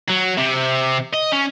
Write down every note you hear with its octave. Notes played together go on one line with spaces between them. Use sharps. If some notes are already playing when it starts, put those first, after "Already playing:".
F#3
C3
D#5
C#4